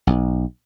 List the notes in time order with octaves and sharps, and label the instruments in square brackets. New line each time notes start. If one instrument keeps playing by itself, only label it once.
[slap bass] B1